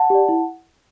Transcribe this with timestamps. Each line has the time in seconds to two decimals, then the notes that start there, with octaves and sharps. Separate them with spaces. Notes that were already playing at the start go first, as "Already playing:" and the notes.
Already playing: F#5 A5
0.10 G4 D5
0.29 E4